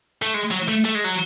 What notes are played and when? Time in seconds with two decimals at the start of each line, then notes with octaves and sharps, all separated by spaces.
0.22 A3
0.34 G#3
0.51 F#3
0.68 A3
0.85 A3
0.95 G#3
1.04 F#3